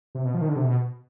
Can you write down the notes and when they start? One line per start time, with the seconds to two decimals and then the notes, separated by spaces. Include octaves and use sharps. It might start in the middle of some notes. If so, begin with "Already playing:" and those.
0.15 C3
0.25 B2
0.35 F3
0.41 D#3
0.48 D3
0.56 C3
0.64 B2